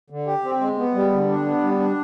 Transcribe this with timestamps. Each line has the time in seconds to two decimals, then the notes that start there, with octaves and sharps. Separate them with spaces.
0.10 D3
0.27 G4
0.44 C4
0.61 G#3
0.78 B3
0.94 G3
1.12 D3
1.29 D4
1.46 B3
1.63 G3
1.80 D4